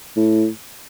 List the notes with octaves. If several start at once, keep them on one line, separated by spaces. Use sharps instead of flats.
A2